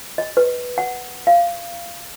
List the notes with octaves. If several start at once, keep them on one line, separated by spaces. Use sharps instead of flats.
D#5
B4
F#5
F5